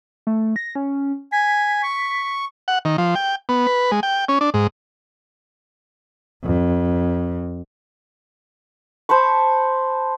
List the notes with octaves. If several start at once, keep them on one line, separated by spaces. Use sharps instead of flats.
A3
A#6
C#4
G#5 B6
C#6
F#5
D#3
F3
G5
B3
B4
G#3
G5
C#4
D4
G#2
F2
C5 A5 B5 C#6